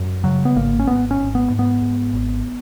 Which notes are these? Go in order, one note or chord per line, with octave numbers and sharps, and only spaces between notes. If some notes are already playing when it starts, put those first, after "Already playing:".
Already playing: F#2
C#3 F#3
B3
G#1 A#3
C#4
G#1 B3
C#4
G#1
B3
G#2
B3
G#2
G#1